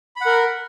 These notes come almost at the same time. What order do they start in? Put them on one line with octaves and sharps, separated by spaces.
B5 F#5 A#4